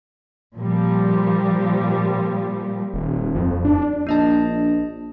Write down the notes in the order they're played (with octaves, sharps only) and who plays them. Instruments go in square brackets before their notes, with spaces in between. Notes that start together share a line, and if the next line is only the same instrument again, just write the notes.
[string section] A#2 F3 G3
[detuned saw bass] D#1
F2
D4
[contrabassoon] A#1 [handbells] D4 D#5 A5